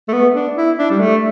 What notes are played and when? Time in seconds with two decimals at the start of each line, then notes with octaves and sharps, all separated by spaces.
0.08 A3
0.13 B3
0.35 D4
0.57 E4
0.78 D4
0.91 G3
1.00 A3